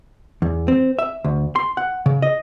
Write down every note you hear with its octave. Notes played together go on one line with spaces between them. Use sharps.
E2
C4
E5
D2
C6
F#5
C#3
D#5